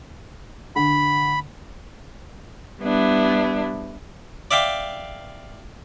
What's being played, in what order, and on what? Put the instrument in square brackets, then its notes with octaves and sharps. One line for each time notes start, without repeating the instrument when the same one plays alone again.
[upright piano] D3 [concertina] B5
[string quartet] G3 B3 D4 E4
[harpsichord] D5 E5 F5 G5 D6